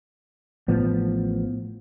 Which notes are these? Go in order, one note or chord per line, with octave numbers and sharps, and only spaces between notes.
A1 A2 F3 B3